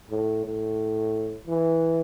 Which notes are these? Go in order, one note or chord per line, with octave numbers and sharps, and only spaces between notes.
A2
A2
E3